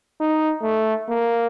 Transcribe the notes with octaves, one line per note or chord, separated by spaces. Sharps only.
D#4
A3
A#3